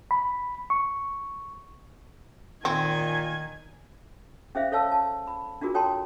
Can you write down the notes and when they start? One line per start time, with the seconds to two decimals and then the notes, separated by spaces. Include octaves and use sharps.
0.11 B5
0.70 C#6
2.65 A#2 D#3 C4 G#5
4.55 C#4 G#4 C5 E5 F5
4.72 A4 C#5 F5 A5 E6
4.92 A5
5.27 B5
5.61 D4 F4 F#4 G#4 A#4
5.74 A4 C#5 G5 A5 A#5 C6